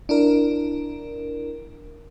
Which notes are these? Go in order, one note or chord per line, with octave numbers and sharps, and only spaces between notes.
D4 E4 A#4